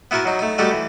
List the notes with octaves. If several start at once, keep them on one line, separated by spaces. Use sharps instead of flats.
B3 E4 F#4 A#4 A5
F#3 D#4
A3 D#4
G3 A3 D#4 F#4 G4 A4
E3